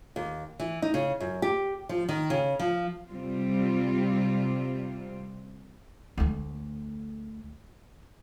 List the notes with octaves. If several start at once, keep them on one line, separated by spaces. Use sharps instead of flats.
D#2
E3
D#4
C#3
F#2
G4
F3
D#3
C#3
F3
C3 G3 C4 F4
D2 A3